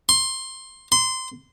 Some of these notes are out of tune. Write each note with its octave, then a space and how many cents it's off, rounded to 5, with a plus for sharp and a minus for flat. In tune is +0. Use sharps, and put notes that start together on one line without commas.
C6 +10
C6 -20